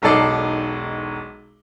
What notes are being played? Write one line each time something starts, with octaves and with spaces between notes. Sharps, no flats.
E1 B1 D#4 A4 D5 C7